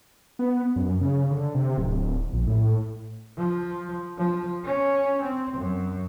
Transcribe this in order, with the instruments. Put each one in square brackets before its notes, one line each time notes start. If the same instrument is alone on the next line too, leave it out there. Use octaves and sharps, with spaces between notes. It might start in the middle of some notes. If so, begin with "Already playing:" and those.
[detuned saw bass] B3
F#2
C#3
D3
C3
D1
A#1
A2
[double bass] F3
F3
C#4
C4
F#2